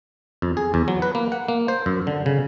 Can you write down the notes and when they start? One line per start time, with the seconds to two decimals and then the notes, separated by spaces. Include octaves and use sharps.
0.42 F2
0.57 G#4
0.74 E2
0.88 F#3
1.02 B4
1.15 A#3
1.32 F#5
1.48 A#3
1.68 C5
1.86 F#2
2.07 D3
2.26 C#3